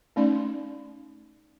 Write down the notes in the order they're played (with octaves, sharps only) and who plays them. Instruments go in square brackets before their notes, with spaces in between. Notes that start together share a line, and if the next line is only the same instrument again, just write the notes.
[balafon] A3 C#4 D#4 D5 C6